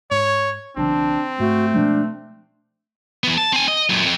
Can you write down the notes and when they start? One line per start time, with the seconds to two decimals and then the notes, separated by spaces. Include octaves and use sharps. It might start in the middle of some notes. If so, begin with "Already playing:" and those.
0.11 G#2 C#5
0.77 B1 C#3 E3 C4 D4
1.40 G#2 A3 F#4
1.74 B2 F3 G#3 D4
3.23 E3 B3
3.38 A5
3.53 C4 G#5
3.68 D#5
3.89 F#2 A#2
4.04 F2